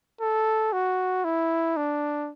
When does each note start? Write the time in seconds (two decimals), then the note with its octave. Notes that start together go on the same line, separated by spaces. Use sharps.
0.21 A4
0.73 F#4
1.25 E4
1.77 D4